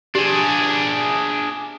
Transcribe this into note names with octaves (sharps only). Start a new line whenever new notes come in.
D4 G4 G#4